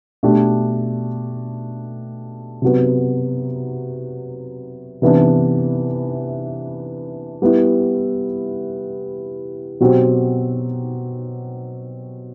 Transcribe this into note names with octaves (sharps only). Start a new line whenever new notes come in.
B2 A3 D4 G4
C3 F#3 B3
C3 E3 B3 D4
G3 B3 E4
B2 F#3 C4 G4